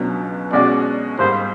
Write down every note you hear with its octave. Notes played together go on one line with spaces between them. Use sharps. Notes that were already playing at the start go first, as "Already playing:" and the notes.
Already playing: C#2 B2 F#3 B3 D4
B2 G#3 C#4 F#4 D5
G#2 D#3 G3 A#3 C5